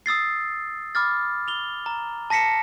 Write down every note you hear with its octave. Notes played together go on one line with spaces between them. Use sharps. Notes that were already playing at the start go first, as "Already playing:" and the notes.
D#6 E6 A6 C7
B5 D6 F6 A6
F7 G7
A#5
A5 A#6 B6 C#7 E7